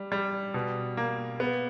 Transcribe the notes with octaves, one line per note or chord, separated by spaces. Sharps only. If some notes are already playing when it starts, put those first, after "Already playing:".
Already playing: G3
G3
B2
A#3
B3